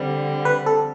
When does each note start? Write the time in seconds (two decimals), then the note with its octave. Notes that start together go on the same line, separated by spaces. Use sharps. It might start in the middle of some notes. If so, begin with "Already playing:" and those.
Already playing: D3 G3 C4
0.45 B4
0.66 A4